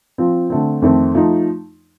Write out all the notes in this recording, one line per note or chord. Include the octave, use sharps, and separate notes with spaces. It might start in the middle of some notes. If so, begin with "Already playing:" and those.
F3 C4 F4
D3 A3 C4
F2 D#3 A3 C4
F3 A3 D#4